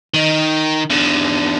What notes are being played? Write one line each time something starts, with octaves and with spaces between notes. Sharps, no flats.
D#3 D#4
E2 D3